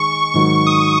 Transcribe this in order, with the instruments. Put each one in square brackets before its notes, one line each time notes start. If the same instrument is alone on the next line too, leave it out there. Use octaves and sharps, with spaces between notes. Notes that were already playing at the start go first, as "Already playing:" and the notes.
Already playing: [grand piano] D#3 G#3 [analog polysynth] C#6
[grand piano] G#2 D#3 F#3 [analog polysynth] C#6
[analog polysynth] D#6